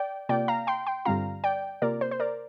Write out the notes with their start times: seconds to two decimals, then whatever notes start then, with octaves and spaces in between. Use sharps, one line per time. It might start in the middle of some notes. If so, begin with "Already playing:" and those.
Already playing: D5 G5
0.29 C3 A#3 F4 D5 G5
0.48 F5 A#5
0.67 G5 C6
0.87 G5 C6
1.05 G2 D3 G3 C4 F4 F5 A#5
1.44 D5 G5
1.82 C3 A#3 F4 A#4 D5
2.01 C5
2.11 C5
2.20 A#4 D5